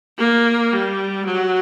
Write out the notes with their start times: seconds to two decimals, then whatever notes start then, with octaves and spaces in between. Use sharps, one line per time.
0.18 A#3
0.72 G3
1.25 F#3